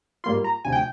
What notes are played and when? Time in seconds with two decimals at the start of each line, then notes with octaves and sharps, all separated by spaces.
0.24 G#2 G3 A#3 F4 C6
0.44 A#5
0.65 D2 C3 F3 G#5
0.72 G5